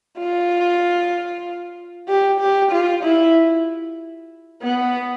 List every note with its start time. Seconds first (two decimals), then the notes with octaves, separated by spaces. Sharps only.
0.18 F4
2.08 G4
2.40 G4
2.72 F4
3.04 E4
4.62 B3